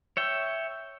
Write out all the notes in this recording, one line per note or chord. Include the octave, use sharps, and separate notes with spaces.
C#5 E5 G5